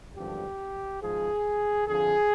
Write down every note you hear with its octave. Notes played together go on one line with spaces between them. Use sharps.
G#1 G2 D3 F3 G4
G#1 G#2 F3 G#4
F2 D3 F3 G#4